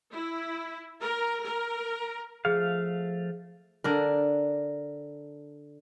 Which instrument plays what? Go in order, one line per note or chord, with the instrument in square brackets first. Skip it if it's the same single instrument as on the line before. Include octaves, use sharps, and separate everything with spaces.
[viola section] E4
A#4
A#4
[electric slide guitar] F3 A3 F5 [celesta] G#4
[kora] D3 D4 A#4